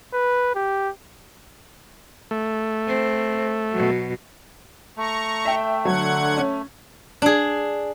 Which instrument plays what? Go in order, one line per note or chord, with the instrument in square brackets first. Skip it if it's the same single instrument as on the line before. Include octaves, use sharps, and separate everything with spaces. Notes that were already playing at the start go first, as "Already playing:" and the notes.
[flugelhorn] B4
G4
[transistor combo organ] A3
[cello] C4
B2 F#3
[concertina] A3 [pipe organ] A#5 C#6
[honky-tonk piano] E5 G5
[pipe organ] D3 F#5 G#6 [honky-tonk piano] F#3
[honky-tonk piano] C#4
[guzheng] D4 G#4